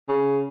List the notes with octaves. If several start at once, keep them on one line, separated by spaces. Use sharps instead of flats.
C#3